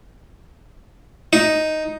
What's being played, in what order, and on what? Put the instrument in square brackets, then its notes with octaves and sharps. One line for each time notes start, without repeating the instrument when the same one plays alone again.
[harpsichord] D#4